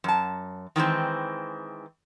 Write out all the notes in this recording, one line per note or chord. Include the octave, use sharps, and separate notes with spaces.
F#2 A5
D#3 E3 G#3 C4